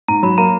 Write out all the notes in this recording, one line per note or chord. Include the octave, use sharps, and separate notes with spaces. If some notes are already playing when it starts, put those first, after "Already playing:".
G#2 A#5
F#3 B5
A#3 A#5